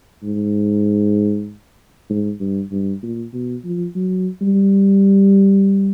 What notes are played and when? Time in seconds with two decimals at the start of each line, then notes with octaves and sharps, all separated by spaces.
0.23 G#2
2.09 G#2
2.40 G2
2.72 G2
3.02 A#2
3.33 B2
3.64 F3
3.95 F#3
4.41 G3